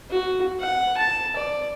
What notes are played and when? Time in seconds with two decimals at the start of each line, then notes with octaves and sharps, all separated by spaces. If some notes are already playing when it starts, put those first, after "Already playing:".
0.10 F#4
0.60 F#5
0.97 A5
1.36 D5